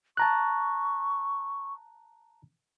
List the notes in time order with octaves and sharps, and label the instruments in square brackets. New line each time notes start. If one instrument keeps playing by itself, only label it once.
[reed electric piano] A5 A#5 F#6 [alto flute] C#6